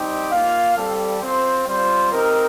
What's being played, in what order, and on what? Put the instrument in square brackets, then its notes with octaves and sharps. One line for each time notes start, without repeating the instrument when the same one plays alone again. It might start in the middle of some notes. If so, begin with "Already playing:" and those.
Already playing: [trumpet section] G3 C4 D#4 G4
A#3 F4 F5
G3 C4 G4 A4
C4 F4 C5
G3 C4 F4 C5
C4 D#4 G4 A#4